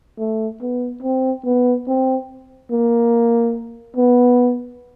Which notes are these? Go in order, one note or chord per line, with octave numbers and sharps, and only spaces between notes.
A3
B3
C4
B3
C4
A#3
B3